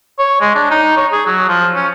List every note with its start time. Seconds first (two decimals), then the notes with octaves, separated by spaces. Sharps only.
0.19 C#5
0.41 G#3
0.55 D4
0.71 D#4
0.97 C#5
1.12 G#4
1.26 F#3
1.49 F3
1.75 C#4